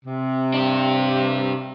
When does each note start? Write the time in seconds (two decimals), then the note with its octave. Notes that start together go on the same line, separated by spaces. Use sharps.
0.04 C3
0.54 D4 G4